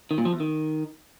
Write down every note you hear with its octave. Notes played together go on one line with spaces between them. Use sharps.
D#3
A#2
F3
E2
D#3